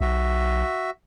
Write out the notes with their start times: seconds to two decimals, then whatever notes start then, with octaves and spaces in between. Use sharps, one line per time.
0.01 B1 F#4 E5